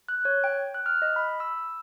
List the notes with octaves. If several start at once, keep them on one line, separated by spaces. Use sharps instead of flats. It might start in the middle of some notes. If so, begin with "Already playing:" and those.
F#6
C#5
G5
F#6
F6
D#5
B5
E6